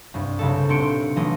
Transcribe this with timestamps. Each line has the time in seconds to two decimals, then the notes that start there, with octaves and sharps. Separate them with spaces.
0.14 C2 G2
0.39 C2 C#3 A4
0.69 D#1 C4 D4 C6 C#7 D7
1.16 B1 E3 A3 D#5